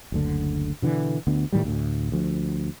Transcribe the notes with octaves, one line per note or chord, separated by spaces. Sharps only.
F#1 D2 D3
B2 D3 E3
D2 D3 B3
A2 D#3 F#3 G3
D2 A2
D2 F3